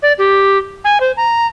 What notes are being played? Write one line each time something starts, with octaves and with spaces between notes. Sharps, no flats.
D5
G4
G#5
C5
A#5